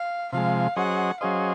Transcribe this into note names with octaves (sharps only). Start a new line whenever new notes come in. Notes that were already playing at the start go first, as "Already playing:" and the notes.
Already playing: F5
C3 F3 G#3 F5
F#3 C#4 G#4 C5 D#5 F#5
F#3 C#4 G#4 C5 D#5 F5